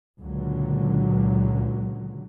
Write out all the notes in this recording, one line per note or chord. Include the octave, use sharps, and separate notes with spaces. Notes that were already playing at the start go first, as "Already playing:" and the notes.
C#2 A#2 D3 F#3